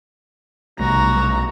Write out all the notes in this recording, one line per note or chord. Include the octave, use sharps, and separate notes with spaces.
B1 C3 G3 A3 F#4 A#5